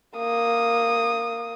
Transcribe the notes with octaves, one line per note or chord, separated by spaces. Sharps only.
A#3 D#6